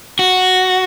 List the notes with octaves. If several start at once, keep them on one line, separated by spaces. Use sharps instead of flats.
F#4